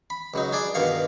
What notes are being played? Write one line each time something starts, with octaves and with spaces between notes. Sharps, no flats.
B5
C#2 F#3 D#4
D4 G#4 D5
G2 B2 D#3 F5 F#5